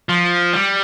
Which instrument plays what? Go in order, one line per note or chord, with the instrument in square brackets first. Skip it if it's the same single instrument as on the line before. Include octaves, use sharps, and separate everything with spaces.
[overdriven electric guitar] F3
G3